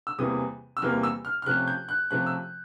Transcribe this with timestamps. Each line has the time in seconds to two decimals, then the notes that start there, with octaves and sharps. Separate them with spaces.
0.07 E6
0.18 E2 C3 E3 G3 A#3 D#6
0.77 E6
0.82 E2 C3 E3 G3 A#3 F6
1.03 E6
1.25 F6
1.42 F6
1.46 C3 F3 A3 C#4 F#6
1.68 G6
1.89 F#6
2.10 C3 F3 A3 C#4 F#6
2.26 E6